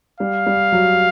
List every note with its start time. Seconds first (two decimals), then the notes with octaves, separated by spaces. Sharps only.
0.20 G3 F5
0.46 G3
0.72 F#3